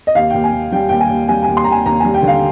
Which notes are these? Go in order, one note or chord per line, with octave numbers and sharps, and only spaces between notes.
D#5
D#2 F5
D#2 G5
G#5
D#2
G3 G5
D#2 G5
G#5
D#2
G3 G#5
G#5
D#2
C6
A#5
D#2 G#5
D#2 A#5
G3 G#5
G5
D3 F5